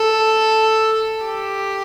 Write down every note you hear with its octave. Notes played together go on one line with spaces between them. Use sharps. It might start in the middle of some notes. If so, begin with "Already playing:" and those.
Already playing: A4
G4